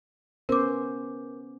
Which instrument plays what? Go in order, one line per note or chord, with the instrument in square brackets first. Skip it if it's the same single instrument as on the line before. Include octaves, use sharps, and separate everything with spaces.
[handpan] B3 C#4 C5 [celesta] A#4 D6